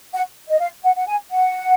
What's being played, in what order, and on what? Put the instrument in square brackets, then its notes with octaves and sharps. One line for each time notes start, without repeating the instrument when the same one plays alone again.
[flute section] F#5
D#5
F5
F#5
F#5
G#5
F#5